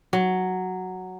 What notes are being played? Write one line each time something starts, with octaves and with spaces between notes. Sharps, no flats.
F#3